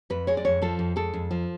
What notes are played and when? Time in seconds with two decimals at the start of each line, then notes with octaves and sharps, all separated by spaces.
0.10 F2 B4
0.27 G#3 C#5
0.37 D5
0.45 F2 C#5
0.62 F3 A4
0.79 F2
0.96 G#3 A4
1.14 F2
1.31 F3